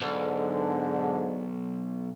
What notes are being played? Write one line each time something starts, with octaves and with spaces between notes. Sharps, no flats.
B1 G#2 D3